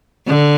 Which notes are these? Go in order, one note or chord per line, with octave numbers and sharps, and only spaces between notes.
D3